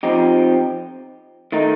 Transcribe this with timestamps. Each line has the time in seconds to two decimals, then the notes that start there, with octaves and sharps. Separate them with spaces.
0.03 F3 C4 D#4 G4
1.52 D#3 A3 D#4